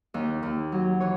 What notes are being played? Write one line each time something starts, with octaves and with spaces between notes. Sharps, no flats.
D#2 D#4
D#2
F#3
E3 C#5